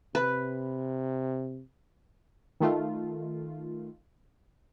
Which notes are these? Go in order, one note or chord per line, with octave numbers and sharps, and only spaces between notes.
C3 B4
D#3 A3 F4